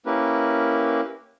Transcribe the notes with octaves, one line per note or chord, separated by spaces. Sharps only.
A#3 C#4 E4 G4 A#4 B4